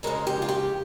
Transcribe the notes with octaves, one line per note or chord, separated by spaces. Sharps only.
F2 C#3 G#3 C#4 A#4
G4
F4
G4